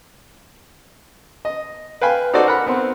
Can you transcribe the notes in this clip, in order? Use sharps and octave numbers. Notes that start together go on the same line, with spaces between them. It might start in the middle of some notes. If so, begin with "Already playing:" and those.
D#5
B4 F5 G5 G#5 B5
D#4 F#4 A4 C5 D5
A#4 F#5 B5
B3 C4